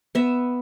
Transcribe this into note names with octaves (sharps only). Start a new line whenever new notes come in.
B3 E5